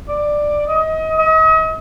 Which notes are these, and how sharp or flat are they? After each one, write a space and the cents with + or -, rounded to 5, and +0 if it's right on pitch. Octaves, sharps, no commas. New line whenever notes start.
D5 +10
D#5 +30
D#5 +40